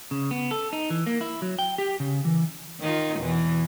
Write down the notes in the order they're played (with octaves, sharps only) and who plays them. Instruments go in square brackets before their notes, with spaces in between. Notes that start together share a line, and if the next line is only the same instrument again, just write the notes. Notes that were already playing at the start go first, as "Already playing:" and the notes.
[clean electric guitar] C#3
B3
A4
D#4
E3
A#3
E4
F#3
G5
G4
C#3
E3
[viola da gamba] D#3 D#4 F4
E2 B2 E3